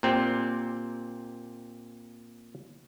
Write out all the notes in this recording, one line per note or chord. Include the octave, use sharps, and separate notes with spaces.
A#2 C4 G4